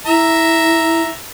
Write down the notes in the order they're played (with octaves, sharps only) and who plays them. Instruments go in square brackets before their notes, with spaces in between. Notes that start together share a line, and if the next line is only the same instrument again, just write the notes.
[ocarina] E4 [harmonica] E5 A#5